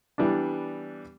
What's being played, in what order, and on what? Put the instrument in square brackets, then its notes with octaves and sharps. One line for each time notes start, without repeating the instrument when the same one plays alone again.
[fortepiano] E3 G3 B3 D4